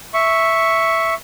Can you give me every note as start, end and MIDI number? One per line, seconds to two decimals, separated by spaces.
0.14 1.14 76
0.14 1.14 85